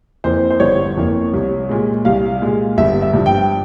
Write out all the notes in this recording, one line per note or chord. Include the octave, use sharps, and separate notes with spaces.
F2 E3 A#3 C5
C5
G1 C#5
F2 E3 A#3
C2
A#2 G#3
C2 F5
A#2 G#3
G1 E5
E5
G2 F3
G5